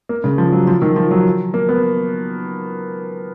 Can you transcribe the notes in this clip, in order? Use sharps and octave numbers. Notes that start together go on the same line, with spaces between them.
A#3
C#3
F3
F#3
F3
D#3
F3
F#3
A#3
B3